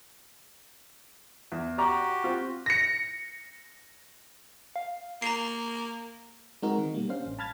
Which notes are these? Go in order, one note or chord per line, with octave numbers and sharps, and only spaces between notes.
E2
F#4 G4 D5 A#5 D6
C4 F4
A#6 C#7
F5
A#3 A#5 C7
G#3 C4 D#4 F#4 A#4
D#3
B2 G3 A#3
C#4 D4 C5 F5
A1
A5 B5 F6 G#6 A6